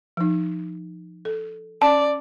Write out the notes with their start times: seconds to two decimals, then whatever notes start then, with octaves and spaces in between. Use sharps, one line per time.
0.17 F3 D#4
1.25 A4
1.82 C#4 D5 A5